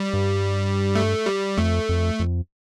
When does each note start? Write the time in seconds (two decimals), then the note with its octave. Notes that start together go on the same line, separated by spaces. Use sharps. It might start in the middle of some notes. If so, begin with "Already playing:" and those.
Already playing: G3
0.13 G2
0.95 A3
1.26 G3
1.57 F2 A3
1.89 F2
2.20 F2